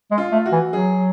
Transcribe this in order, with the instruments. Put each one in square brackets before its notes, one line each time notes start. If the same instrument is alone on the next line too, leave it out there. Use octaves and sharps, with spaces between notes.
[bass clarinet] G#3
[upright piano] F4
[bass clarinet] A3
[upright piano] F#4
[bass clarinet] E3
[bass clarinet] F#3 [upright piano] G#4